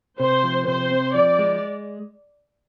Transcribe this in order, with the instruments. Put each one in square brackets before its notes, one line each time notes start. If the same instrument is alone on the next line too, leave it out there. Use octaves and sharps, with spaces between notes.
[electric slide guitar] C3 [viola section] C5
[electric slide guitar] F3
[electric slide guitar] C3 [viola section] C5
[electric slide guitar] C4
[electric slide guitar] F3 [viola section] D5
[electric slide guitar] G#3